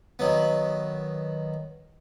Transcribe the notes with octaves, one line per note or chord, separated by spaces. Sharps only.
D#3 F#3 B3